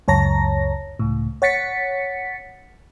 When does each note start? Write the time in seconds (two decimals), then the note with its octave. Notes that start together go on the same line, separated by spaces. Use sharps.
0.08 C#2 F#2 C#5 A5 A#5 A#6
0.99 C#2 A2
1.42 C#5 F#5 A6 B6 C#7